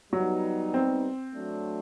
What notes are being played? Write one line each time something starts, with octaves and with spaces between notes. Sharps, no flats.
F#3 G3 B3 D#4
C4
F#3 A3 D4